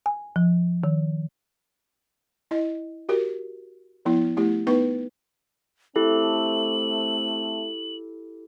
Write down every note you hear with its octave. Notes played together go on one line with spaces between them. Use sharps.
G#5
F3
D#3
E4 D#5
F#4 G4 A#4
F3 B3 E4
A3 E4 G4
B3 D#4 B4 C#6
A3 C4 E4 G4 A4 F#7